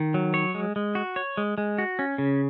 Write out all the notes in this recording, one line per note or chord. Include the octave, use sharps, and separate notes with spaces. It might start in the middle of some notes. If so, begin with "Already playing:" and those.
Already playing: D#3
F#3
C#5
G#3
G#3
F#4
C#5
G#3
G#3
F#4
C#4
C#3